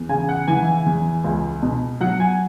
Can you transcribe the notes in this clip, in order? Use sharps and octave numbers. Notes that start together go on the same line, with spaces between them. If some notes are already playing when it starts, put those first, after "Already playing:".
Already playing: E2
C#3 G#5
F#5
E3 G#5
E2
C#2
B2
F#3 F#5
G#5